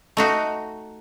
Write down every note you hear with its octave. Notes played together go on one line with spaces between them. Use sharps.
A3 D#4 F#4